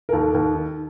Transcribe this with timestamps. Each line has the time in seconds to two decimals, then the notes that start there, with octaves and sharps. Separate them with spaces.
0.09 A#4
0.12 D#2 A4
0.34 D#2
0.55 D#3